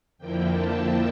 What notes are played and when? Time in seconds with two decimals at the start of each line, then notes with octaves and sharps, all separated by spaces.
0.18 F2 D3 F3 A#3 E4 G5
0.51 A5